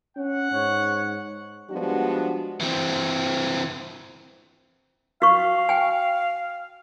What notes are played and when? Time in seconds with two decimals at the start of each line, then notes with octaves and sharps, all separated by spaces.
0.17 C#4 F#5
0.52 G#2 C#5
1.70 F3 G3 G#3 B3 D4 F#4
2.61 E3 C4
5.22 F#4 F5 C#6
5.69 G5 G#5